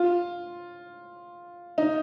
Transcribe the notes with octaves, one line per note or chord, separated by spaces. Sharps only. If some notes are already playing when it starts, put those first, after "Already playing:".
Already playing: F4
D#4